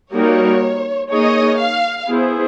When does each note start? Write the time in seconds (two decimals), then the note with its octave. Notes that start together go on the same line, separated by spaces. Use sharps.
0.14 G3 A#3 D#4 F#4 A#4 C#5
1.11 A#3 D#4 G#4 C#5 D#5
1.60 F5
2.08 B3 E4 G#4 C5